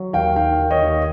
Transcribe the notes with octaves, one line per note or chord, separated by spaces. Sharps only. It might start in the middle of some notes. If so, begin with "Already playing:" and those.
Already playing: F#3
D#2 F5 G5
D#3 F5 G5
D#2
C#5 D#5
D#2